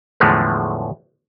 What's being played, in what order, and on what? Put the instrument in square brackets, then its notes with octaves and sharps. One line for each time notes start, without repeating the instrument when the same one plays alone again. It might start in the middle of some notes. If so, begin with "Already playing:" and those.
[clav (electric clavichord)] E2 A2 D3 F3 G#3 A3